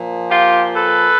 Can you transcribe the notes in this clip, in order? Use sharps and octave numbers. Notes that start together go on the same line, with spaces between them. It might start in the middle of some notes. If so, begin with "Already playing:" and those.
Already playing: A#2 F3
F4 G4
A4 B4